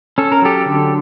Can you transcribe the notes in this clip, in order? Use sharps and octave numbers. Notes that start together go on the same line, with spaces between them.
C#4 A4
A#4
F#3 G4 A4
D3